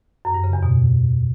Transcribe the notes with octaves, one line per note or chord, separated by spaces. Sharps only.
F#2
G2
C#3
E2
B2